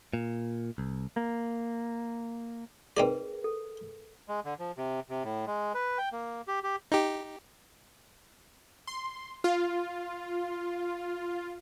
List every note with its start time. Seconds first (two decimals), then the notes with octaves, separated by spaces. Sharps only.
0.14 A#2
0.78 C2
1.16 A#3
2.97 C4 D#4 G#4 A#4 B4 D5
3.44 A4
4.29 G#3
4.45 D3
4.59 F3
4.78 C3
5.10 C3
5.24 A2
5.47 G#3
5.75 B4
5.98 G5
6.12 A#3
6.48 G4
6.64 G4
6.92 D#4 G4
8.87 C6
9.44 F4